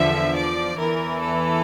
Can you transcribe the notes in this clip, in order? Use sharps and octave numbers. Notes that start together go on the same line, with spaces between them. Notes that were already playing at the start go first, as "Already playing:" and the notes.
Already playing: E2 D3 F3 E5
D5
E2 E3 A#4
A4